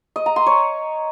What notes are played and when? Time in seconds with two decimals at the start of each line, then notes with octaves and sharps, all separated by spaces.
0.16 D#5
0.26 A#5
0.36 C6
0.46 C#5